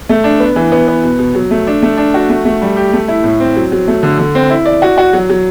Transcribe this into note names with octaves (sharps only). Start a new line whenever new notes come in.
A3
D4
B3
E3
B3
B3
B2
B2
F#3
A3
D4
A3
D4
F#4
A3
A3
G3
G4
A3
E4
A2
C4
F#3
F#3
A3
D3
D3
C4
E4
D5
F#4
F#4
F#3
F#3